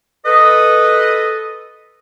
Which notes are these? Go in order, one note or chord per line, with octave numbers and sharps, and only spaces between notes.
A4 B4 D#5